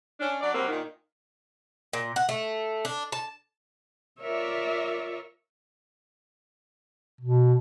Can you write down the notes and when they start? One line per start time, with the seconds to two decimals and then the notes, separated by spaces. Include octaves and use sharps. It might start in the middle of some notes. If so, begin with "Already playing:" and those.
0.20 C#4 D4
0.41 F#3 D4 D5
0.54 F#3 G3 A#3 C4
0.68 A#2 D#3
1.93 A#2
2.16 F#5
2.29 A3
2.85 D4
3.12 A5
4.21 F4 A#4 C#5 D5 E5
7.21 B2